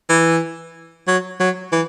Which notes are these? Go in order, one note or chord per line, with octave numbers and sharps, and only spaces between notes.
E3
F#3
F#3
E3